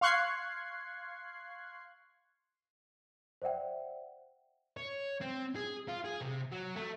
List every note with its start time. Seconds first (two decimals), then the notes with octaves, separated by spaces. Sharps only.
0.01 F5 C6 C#6 F#6 G#6 C7
3.42 C5 D5 E5 F#5 G5
4.77 C#5
5.21 C4
5.55 G#4
5.88 F4
6.05 G#4
6.21 C3
6.52 F#3
6.76 A3